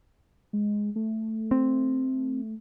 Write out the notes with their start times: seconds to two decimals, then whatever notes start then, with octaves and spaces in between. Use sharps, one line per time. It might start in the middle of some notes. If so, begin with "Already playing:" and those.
0.53 G#3
0.96 A3
1.51 C4